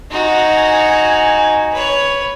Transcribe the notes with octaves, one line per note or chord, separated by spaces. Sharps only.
D#4 F#4 G#5
B4 C#5